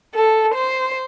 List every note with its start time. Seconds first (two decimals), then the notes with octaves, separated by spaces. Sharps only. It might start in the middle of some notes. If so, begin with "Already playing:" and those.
0.14 A4
0.54 C5